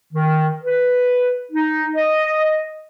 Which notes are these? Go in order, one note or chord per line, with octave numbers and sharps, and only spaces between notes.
D#3
B4
D#4
D#5